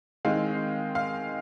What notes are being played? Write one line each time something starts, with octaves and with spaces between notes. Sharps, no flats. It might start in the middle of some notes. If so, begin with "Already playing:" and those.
D#3 G#3 C4 F5
F5